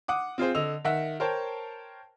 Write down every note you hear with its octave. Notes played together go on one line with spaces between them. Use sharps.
F#5 D6 D#6
C4 F4 G#4 C5
D3 D#5 E6 F7
D#3 E5 F#5 E6
A#4 C5 C#5 G5 A5